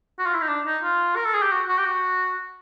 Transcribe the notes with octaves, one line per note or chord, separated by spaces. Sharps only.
F#4
F4
E4
D#4
D4
D#4
F4
A#4
A4
G#4
G4
F#4
F#4
G4
F#4